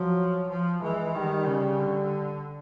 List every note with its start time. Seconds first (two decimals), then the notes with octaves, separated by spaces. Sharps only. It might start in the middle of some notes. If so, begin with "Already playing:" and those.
Already playing: F3 F#3
0.49 F3
0.82 E3 G#3
1.15 D#3 G3
1.47 C#3
1.79 D3